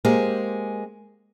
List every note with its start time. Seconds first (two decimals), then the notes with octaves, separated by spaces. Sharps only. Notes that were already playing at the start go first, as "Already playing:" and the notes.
0.05 G#3 A#3 C4 G4